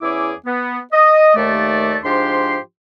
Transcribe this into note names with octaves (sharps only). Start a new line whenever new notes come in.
E2 C#4 E4 G#4 E5 D6
B3
D#5
D#2 A3 D5
G#2 F3 D4 G4 C6